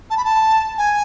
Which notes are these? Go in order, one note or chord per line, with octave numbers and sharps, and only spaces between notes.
A5
B5
A5
G#5